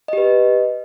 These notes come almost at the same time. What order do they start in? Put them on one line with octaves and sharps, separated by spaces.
D#5 G4 B4